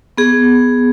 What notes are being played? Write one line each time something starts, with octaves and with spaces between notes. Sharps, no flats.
B3 G#4